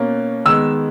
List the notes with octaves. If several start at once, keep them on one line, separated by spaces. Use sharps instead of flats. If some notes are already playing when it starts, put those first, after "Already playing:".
Already playing: B2 A#3 C#4
D#3 G#3 B3 E6